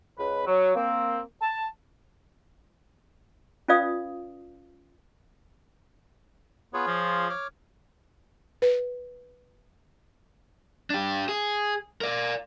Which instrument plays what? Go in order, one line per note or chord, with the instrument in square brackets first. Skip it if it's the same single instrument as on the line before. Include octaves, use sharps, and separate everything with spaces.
[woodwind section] C#2 B4
F#3
A#3 C4
A5
[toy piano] C#4 F4 B4 D5 F5 D#6
[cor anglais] B3 [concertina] F4 G#4 C#5
[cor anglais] F3
[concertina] C#5 D6 F6
[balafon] B4
[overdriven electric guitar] D4 G4
G#4
A#4 D5